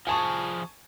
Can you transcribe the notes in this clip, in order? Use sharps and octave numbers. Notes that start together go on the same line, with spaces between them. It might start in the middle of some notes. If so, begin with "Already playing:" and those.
F3 G#4 G#5 A5 C#6